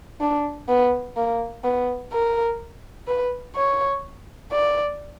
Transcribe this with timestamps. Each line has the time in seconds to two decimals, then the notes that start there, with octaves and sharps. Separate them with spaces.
0.21 D4
0.68 B3
1.17 A#3
1.64 B3
2.12 A#4
3.07 B4
3.55 C#5
4.52 D5